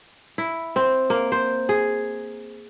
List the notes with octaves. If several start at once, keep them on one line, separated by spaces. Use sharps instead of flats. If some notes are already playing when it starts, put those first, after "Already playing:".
E4
C4
A#3
C5
G#4